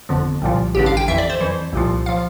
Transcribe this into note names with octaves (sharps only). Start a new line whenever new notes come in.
G1 F2 D3 F3
C2 A#2 F3
A1 G2 D3 G4
F5
G5
F2 E3 E5
D5
C5
F2 E3
C2 A#2 F3
F3 F5